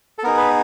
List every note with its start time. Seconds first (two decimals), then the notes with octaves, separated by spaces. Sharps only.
0.19 A4
0.24 B3 D#4 G#4 A#4
0.37 B4